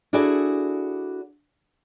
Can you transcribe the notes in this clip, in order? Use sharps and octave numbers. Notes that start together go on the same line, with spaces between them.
D4 E4 F#4 G#4 A4 D5